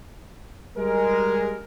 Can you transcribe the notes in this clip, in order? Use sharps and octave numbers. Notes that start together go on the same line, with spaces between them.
G3 G#3 A#4